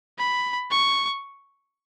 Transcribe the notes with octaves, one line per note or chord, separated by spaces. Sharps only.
B5
C#6